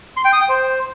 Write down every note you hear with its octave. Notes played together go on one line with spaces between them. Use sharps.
C6
G5
D#6
G5
C5